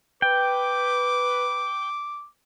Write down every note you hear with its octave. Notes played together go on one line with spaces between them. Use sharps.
B4 G5 D6